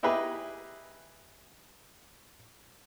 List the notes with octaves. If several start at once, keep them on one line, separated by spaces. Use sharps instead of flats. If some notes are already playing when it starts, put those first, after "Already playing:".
D#4 E4 G4 G#4 B4 D#5